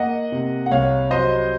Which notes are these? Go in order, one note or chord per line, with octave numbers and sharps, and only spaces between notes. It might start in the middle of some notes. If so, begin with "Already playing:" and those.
Already playing: A#3 D#5 F#5
C3
F#5
C2 C#5 F5
F#3 C5 D#5